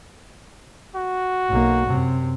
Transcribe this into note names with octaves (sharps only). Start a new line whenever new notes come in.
F#4
B1 A#3
F#2 C3